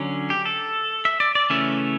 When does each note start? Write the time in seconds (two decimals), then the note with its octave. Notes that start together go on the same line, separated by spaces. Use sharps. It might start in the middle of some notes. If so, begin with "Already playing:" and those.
Already playing: D3 F#3 C#4
0.30 G4
0.45 A4
1.05 E5
1.20 D5
1.35 D5
1.50 C#3 E3 A3 C#4 E5